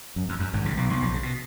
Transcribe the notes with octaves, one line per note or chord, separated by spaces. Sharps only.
F#2
F2
F#2
G#1 G#2
C#2 C#3
B1 B2
B1 B2
A#1 A#2
C#3
B2